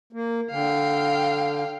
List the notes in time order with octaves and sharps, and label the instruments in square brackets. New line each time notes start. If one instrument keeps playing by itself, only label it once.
[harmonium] A#3
[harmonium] D3 [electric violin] F5 G5